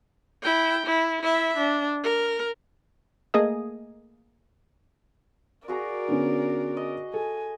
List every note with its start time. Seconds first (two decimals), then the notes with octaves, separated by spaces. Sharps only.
0.43 E4 G5
0.86 E4
1.22 E4 E5
1.57 D4
2.04 A#4
3.34 A3 A#3 G#4 D#5 D#6
5.68 F#4 G#4 A#4 D5 A#5
6.08 D3 B3 C#4
6.77 D#5
7.14 A4 G#5